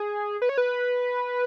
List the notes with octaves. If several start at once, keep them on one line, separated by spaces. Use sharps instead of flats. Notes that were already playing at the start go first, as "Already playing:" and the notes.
Already playing: G#4
B4
C#5
B4